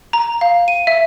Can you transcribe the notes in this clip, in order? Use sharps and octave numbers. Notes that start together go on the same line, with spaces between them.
A#5
F5
D#7
E5